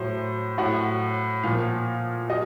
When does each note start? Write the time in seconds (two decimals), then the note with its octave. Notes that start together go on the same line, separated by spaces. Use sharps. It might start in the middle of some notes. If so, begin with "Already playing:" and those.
Already playing: A2 F#3 C5
0.58 A2 F#3 F#5
1.43 A#2 F3 F5
2.30 F#3 D#5